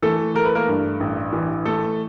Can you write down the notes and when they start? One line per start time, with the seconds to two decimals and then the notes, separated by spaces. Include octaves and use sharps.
0.02 E3 A3 A4
0.35 A3 A#4
0.45 B4
0.55 A#3 A#4
0.68 G2
1.00 A1
1.33 E3
1.65 A3 A4